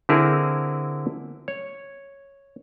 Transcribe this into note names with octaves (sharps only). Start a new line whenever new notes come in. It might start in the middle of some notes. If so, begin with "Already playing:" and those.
D3 C4 E4 G#4 A#4
C#5